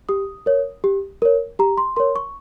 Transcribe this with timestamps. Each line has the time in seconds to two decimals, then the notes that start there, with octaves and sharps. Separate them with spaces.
0.09 G4 D#6
0.46 A#4 C#5
0.84 G4
1.22 A#4 C#5
1.59 G4 A#5
1.78 C6
1.96 A#4 C#5 C6
2.16 C#6